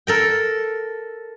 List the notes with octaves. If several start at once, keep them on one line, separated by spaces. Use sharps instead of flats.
A4 A#4 G5